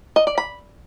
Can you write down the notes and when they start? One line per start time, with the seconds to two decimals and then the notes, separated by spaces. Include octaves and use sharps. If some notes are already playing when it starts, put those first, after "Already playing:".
0.16 D#5
0.27 D5
0.38 B5